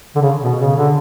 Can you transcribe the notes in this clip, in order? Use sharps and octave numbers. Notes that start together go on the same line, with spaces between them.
D3
C#3
B2
C#3
D3